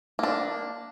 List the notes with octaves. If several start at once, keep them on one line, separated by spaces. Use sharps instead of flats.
A#3 D4